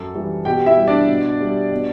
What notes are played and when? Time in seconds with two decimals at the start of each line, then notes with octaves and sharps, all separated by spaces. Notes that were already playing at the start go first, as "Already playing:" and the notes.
Already playing: F#2 A4
0.14 E3 G3
0.45 B2 G4 G5
0.66 E4 E5
0.77 G3
0.88 D4 D5
1.08 B2
1.40 G3
1.72 B2